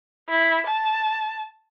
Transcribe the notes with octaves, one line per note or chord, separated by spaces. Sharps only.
E4
A5